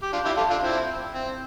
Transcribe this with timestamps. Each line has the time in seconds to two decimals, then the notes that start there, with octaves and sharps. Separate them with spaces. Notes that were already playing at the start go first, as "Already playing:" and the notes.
0.03 G4
0.13 D4 F4
0.25 E4 G4
0.37 F4 A4
0.50 D4 F4
0.63 C4 E4
1.14 C4